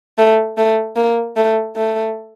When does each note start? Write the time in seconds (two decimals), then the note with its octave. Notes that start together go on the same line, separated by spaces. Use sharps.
0.18 A3
0.57 A3
0.97 A#3
1.36 A3
1.76 A3